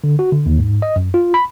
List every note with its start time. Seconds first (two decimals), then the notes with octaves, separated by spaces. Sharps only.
0.04 D3
0.19 F#4
0.33 D3
0.46 D#2
0.59 G#2
0.82 D#5
0.96 F#2
1.14 F4
1.34 B5